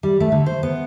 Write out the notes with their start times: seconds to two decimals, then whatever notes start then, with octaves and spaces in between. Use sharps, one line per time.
0.03 G3
0.20 A3
0.32 D3
0.46 C5
0.63 B3